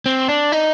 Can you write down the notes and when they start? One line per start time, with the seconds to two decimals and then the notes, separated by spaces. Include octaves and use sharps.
0.06 C4
0.28 D4
0.52 D#4